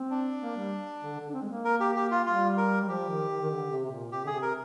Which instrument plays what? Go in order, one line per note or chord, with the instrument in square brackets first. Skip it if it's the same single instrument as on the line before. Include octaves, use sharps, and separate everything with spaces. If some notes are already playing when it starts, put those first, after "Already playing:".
Already playing: [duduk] C4
[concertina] D4
[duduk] A#3
G3
D3
D3
D4
C4
G#3
A#3
[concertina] A#4
G4
G4
F4
[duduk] G3 [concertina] F4
[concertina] A#4
[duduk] G3
[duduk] F3 [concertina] G4
[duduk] D#3
D#3
D#3
D3
C3
C3
A#2
[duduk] C3 [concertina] G4
[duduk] D3
[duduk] C3 [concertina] G#4
[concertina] A#4